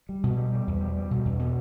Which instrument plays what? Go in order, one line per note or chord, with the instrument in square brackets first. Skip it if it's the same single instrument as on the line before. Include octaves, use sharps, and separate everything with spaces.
[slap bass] G3
B2
G3
G3
E2
G3
G3
B2
E2
B2